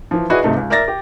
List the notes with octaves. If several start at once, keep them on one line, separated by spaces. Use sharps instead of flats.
E3 F3
E4 F#4 G#4 B4 D5 D#5
G2 C3 A3 D#4
C#2
A#4 D5 E5 A6 A#6
G4